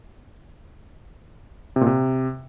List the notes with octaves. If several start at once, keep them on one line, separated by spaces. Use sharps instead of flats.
C3
A#2
C3